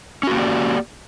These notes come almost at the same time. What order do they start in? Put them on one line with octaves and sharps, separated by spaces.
C#4 F#4 A#3 G4 D5